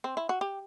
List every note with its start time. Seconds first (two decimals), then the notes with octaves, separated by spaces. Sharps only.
0.04 C4
0.17 E4
0.29 F#4
0.41 G4